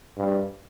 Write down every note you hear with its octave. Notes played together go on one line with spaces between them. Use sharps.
G2